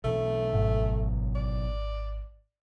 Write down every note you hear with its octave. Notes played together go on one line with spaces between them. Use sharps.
B1 E3 A3
G#1
D5